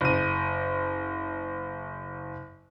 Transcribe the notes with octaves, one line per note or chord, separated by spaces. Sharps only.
F#1 D#7